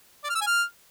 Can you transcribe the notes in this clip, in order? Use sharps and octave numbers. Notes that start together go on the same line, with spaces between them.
D5
F6
E6
G#5
F6